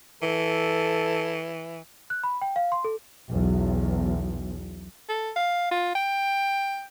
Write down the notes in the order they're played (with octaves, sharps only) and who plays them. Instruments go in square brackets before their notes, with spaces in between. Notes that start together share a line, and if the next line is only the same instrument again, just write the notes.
[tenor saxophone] E3 [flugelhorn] A4
[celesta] F#6
B5
G5
F5
C6
A4
[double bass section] B1 E2
[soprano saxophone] A4
F5
F4
G5